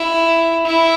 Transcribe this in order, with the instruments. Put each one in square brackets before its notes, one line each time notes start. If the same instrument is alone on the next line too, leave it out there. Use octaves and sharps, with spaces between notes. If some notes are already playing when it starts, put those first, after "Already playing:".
Already playing: [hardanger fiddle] E4
E4